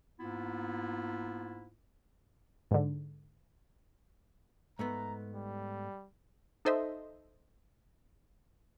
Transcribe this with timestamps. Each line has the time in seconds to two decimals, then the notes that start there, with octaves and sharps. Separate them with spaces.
0.19 G#2 A#3 B3 E4 F4
2.71 G#2 D3
4.79 G#2 A3 B3 A#5
5.35 G3
6.65 D#4 A4 C5 D#5 E5